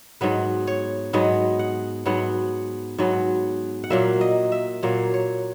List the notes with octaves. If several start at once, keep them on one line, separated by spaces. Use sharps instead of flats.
G#2 F#3 B3 B4
C#5
G#2 F#3 B3 D#5
F#5
G#2 F#3 B3 F#5
G#2 F#3 B3
F#5
A#2 F#3 A#3 E5
D#5
E5
A#2 F#3 A#3 C#5
C#5